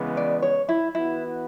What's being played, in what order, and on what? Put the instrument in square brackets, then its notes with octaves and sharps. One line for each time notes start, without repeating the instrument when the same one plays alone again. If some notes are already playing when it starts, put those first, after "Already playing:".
Already playing: [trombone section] C#3 E3 G#3 B3
[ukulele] D5
C#5
E4
[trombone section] E3 B3 F#4 B4 [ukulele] E4